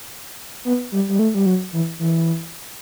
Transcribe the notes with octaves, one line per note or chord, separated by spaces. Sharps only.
B3
G3
G3
A3
G3
F#3
E3
E3